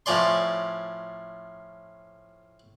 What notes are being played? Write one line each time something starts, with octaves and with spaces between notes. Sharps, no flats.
A2 F3 C#4 D5 C6